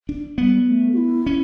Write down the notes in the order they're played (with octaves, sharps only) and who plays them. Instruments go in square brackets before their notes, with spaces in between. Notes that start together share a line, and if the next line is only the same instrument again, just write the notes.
[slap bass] D4
[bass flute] G3 [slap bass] B3
[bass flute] A3
F#4
E4
[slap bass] C#4